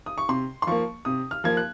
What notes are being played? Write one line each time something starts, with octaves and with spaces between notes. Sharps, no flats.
D#6
C#6
C3 C6
C6
F3 A#3 C#6
C3 D#6
F6
F3 A#3 G#6
F#6